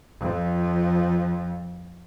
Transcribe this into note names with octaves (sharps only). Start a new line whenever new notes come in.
F2 F3